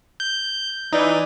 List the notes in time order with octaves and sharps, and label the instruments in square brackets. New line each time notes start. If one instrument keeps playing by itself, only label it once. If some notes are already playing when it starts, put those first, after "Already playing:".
[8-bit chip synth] G6
[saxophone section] E3 D5 [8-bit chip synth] D#4